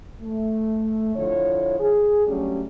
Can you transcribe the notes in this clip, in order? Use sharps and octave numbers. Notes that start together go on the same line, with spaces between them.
A3
D3 F3 E4 C#5
G#4
F#3 G3 A3 C#4 D4 G4